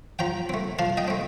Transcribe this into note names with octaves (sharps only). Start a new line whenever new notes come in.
F3 G5 A#5
A3 C4
F3 F5 A5
D#5 G5
A3 C4